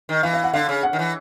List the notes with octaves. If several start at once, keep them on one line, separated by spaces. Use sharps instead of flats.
D#3
E3 F5
F5
F#5
D3 F5
C#3
F#5
D#3
E3